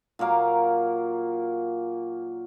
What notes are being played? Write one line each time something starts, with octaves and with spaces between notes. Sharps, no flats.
A#2 F#3 A#3 F5